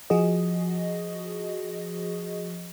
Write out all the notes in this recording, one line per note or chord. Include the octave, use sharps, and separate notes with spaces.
F3 F#4 G#4 D#5